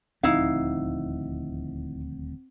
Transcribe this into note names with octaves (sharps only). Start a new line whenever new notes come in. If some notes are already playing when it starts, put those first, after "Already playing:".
D#1 D2 F3 C4 D#4 E4 F5